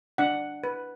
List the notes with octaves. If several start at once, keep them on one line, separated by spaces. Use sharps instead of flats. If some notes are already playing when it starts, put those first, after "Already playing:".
D4 F#5
B4